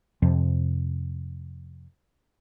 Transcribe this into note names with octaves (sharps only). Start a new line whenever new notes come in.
F2 C3 F3